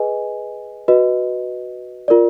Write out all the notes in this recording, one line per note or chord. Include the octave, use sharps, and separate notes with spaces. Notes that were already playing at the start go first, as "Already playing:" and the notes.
Already playing: G#4 B4 D#5 G#5
F#4 B4 D#5
F4 A#4 D5